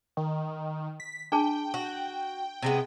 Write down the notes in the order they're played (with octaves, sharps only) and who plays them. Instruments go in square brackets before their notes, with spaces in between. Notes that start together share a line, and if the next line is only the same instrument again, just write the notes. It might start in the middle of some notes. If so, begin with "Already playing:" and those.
[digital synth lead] D#3
B6
[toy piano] D4 G#4 A5 [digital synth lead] G5
[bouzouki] F#4
C3 G#3 B3